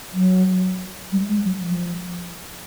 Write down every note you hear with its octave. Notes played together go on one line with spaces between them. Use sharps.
F#3
G3
G#3
F#3
F3